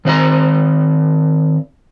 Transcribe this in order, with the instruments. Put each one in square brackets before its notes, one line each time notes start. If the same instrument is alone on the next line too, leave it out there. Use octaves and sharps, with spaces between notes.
[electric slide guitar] D#3 C4 E5 A#5